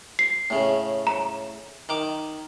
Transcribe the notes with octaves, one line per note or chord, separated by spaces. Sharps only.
C7
A2 C#3
A#5
D#3 D6